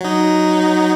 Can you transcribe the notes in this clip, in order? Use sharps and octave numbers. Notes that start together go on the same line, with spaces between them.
F#3 D#4